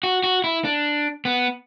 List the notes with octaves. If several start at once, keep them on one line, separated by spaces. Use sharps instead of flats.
F#4
F#4
E4
D4
B3